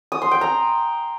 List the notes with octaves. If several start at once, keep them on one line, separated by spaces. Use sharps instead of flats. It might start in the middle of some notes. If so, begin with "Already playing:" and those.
D#6
C6
G5
A#5